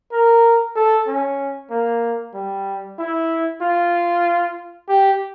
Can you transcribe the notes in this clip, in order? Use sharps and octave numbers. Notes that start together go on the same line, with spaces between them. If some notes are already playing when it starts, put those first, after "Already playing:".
A#4
A4
C#4
A#3
G3
E4
F4
G4